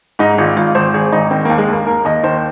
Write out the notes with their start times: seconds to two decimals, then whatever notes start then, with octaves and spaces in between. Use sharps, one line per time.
0.19 G#2 D#4
0.38 G#1 F4
0.57 G#1 F4
0.75 G#1 C5
0.94 G#1 G#4
1.12 G#1 D#4
1.31 D#3 C4
1.45 D#2 A#3
1.58 G#3
1.68 D#2 A#3
1.86 D#2 A#4
2.05 D#2 D#5
2.23 D#3 C5